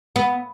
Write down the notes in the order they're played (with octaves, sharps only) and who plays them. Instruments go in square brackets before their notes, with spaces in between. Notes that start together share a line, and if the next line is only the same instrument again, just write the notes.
[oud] B3